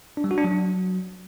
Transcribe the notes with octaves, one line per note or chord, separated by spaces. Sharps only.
D4
G3
F#4
D4
F#3